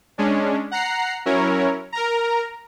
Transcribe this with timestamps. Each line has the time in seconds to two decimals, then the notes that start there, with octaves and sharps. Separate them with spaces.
0.18 G#3 C#4 D4
0.71 F#5 A#5 C7
1.26 F#3 C#4 E4 A#4 C#5
1.92 A#4 A#5